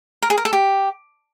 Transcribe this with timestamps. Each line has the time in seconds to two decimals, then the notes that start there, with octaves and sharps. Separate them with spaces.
0.22 A#4
0.30 G#4
0.38 A#4
0.45 A4
0.53 G4